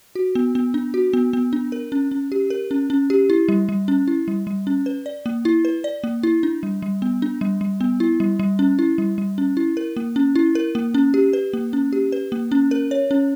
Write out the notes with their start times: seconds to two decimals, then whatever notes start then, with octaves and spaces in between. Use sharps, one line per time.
0.15 F#4
0.35 B3
0.55 B3
0.74 D4
0.94 F#4
1.13 B3
1.33 B3
1.53 D4
1.72 A#4
1.92 C#4
2.11 C#4
2.32 G4
2.50 A#4
2.71 C#4
2.90 C#4
3.10 G4
3.30 E4
3.48 G3
3.69 G3
3.88 C#4
4.08 E4
4.28 G3
4.47 G3
4.67 C#4
4.86 B4
5.06 D5
5.26 A#3
5.45 E4
5.65 B4
5.84 D5
6.04 A#3
6.23 E4
6.43 D4
6.63 G3
6.82 G3
7.02 B3
7.22 D4
7.41 G3
7.61 G3
7.81 B3
8.00 E4
8.20 G3
8.39 G3
8.59 C#4
8.79 E4
8.98 G3
9.18 G3
9.38 C#4
9.57 E4
9.77 A#4
9.96 A#3
10.16 C#4
10.36 E4
10.55 A#4
10.75 A#3
10.94 C#4
11.14 G4
11.33 B4
11.53 A#3
11.73 C#4
11.93 G4
12.12 B4
12.32 A#3
12.52 C#4
12.71 A#4
12.91 C#5
13.11 C#4